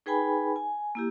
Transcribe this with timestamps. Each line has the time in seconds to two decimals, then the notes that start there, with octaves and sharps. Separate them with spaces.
0.06 D#4 G#4 B4 G5 G#5 B5
0.56 G#5
0.95 A#3 E4 G4